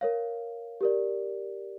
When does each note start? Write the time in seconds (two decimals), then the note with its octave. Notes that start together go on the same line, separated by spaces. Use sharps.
0.01 A#4 C#5 F5
0.81 G4 A#4 D5